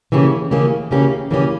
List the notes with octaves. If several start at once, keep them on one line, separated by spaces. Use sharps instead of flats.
C#3 E3 A#3 C#4 G4
C#3 E3 A#3 C#4 G4
C#3 E3 A#3 C#4 G4
C#3 E3 A#3 C#4 G4